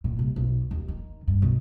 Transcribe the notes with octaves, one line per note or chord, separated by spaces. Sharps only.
A#2
C2
B1
D#2
D#3
G2
B1